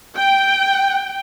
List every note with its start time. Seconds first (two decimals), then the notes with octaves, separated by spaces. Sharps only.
0.15 G5